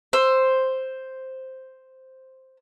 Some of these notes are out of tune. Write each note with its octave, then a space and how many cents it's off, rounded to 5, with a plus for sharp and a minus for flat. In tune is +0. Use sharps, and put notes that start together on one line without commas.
C5 +0 E6 +15